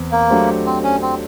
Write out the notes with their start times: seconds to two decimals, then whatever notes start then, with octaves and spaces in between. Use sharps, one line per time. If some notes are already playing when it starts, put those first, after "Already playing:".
Already playing: E2 C4
0.11 A#3
0.30 F#3 A3 D4 G4 C5
0.66 C4
0.84 C#4
1.02 C4